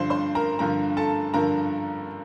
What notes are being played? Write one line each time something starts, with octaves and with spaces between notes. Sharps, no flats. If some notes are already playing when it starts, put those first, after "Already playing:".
Already playing: G2 D3 F3 C5 C6
C5 C6
A#4 A#5
G2 D3 F3 A#4 A#5
A4 A5
G2 D3 F3 A#4 A#5